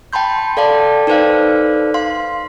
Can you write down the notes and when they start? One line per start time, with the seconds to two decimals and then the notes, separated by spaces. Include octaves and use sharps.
0.13 G5 A5 B5 C6 G6
0.57 A4 D5 F5 G5 A5
1.07 D#4 A4 B4 C5 D5 F5
1.94 F5 C6